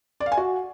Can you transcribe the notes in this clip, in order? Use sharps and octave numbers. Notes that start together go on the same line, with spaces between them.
D5
F5
G#5
F#4